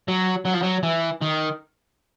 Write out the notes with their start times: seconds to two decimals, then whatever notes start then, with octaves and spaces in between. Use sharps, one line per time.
0.08 F#3
0.46 F#3
0.54 F3
0.63 F#3
0.83 E3
1.21 D#3